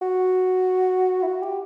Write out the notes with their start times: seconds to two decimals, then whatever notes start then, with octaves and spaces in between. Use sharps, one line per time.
0.02 F#4
1.23 E4
1.27 F#4
1.43 G4